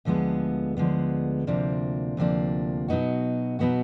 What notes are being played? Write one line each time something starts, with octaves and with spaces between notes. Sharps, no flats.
D2 D3 F3 G#3 B3
D2 D3 F3 G#3 B3
D2 C3 F3 A#3 D4
D2 C3 F3 A#3 D4
B2 F#3 B3 D#4 F#4
B2 F#3 B3 D#4 F#4